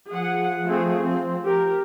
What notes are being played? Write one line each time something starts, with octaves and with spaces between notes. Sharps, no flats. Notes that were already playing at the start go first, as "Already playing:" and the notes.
F3 G#4 F#5
A3 C4 G#4
C4
G4 A#4